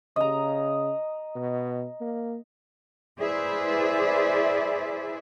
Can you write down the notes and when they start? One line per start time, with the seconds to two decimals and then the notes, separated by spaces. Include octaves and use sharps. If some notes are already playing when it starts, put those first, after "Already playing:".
0.16 C#3 D#5 A#5
1.35 B2
2.01 A#3
3.19 E4 G#4 B4 C5 D5 E5